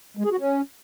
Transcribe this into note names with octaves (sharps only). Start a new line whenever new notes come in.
G#3
G#4
F#4
C#4